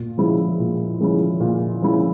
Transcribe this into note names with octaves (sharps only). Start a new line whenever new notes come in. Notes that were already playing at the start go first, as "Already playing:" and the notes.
Already playing: A#2
F3 G#3 C#4 E4
A#2
F3 G#3 C#4 E4
A#2
F3 G#3 C#4 E4